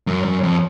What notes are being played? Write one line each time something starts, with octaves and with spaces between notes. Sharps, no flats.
F#2
F#2
F2